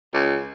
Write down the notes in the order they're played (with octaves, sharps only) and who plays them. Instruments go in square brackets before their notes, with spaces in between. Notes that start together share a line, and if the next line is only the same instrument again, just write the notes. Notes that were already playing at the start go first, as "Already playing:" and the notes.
[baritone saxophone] C#2